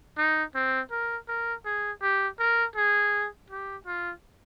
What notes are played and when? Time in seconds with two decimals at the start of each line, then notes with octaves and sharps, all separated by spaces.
0.18 D#4
0.55 C4
0.91 A#4
1.28 A#4
1.66 G#4
2.02 G4
2.39 A#4
2.76 G#4
3.50 G4
3.86 F4